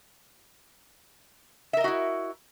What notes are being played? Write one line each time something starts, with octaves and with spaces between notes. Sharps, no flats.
E4 F#4 A#4 D#5 E5